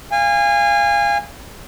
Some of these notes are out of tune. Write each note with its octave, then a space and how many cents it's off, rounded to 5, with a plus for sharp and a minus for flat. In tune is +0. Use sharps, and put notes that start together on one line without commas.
F5 -20 G#5 -30